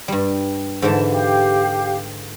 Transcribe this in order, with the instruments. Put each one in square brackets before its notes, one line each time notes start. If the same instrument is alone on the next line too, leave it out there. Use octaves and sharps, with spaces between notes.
[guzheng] G2 G3
[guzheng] G#2 D3 E3 [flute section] A5
[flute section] G4 F5